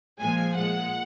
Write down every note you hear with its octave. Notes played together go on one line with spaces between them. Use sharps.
A#2 F3 G#3 G#5
A#2 G#3 F#5